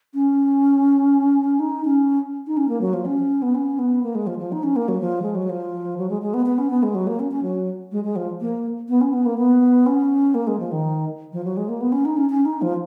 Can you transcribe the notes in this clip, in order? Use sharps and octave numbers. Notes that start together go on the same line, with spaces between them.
C#4
D#4
C#4
D#4
C#4
A#3
F#3
F3
C#4
B3
C#4
B3
A#3
G#3
F3
F3
D#4
C#4
A#3
F#3
F3
G#3
F#3
F3
F#3
G#3
G#3
B3
B3
C#4
B3
G#3
F#3
A#3
C#4
C#4
F#3
G#3
G#3
F3
A#3
B3
C#4
B3
A#3
B3
C#4
A#3
G#3
F3
D#3
F3
F#3
G#3
A#3
B3
C#4
D#4
C#4
C#4
D#4
F3